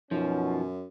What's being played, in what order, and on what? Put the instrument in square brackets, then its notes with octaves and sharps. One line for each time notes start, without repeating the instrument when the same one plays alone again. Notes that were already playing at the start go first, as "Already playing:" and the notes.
[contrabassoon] F#2 [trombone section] B2 C#4 [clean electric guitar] F3 [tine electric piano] D#4